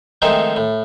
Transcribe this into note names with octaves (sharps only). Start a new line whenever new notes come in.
D#3 F3 G#3 A3 C4 D#4
A2